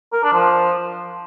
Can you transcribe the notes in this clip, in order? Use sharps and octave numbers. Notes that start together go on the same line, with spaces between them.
A#4
D4
F3